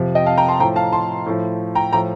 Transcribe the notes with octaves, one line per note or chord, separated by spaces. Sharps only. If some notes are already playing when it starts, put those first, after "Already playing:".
Already playing: F2 C3 F3
D#5 G5
F5 A5
G5 A#5
A5 C6
A2 F3 G5 A#5
F5 A5
A5 C6
A2 F3
G5 A#5
A2 F3 G5 A#5